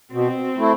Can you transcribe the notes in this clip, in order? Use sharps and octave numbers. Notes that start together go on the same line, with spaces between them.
B2 C4
A3 E4